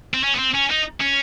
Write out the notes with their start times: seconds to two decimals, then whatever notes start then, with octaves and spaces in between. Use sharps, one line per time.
0.14 C4
0.24 C#4
0.35 B3
0.39 C4
0.54 C#4
0.70 D#4
1.00 C#4